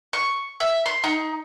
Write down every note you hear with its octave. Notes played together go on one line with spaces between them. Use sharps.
C#6
E5
C6
D#4